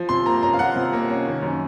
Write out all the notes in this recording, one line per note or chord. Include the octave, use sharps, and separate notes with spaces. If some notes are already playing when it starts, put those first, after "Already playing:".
Already playing: F3
C3 C6
A#3 A#5
C#4 A#5
F5
F3 F#5
C3
A#3
C#4
D#3
F#2